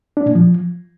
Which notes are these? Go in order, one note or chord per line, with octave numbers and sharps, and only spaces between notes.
D4
A#2
F3